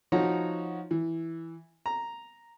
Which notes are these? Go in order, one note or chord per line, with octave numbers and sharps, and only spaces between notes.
F3 D#4 F#4 C#5 A#5
E3
A#5